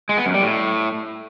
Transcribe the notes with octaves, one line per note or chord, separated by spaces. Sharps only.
G#3
B3
F#2
G3
A2